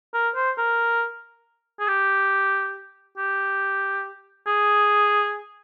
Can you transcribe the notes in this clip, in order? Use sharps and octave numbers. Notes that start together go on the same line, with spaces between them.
A#4
C5
A#4
G#4
G4
G4
G#4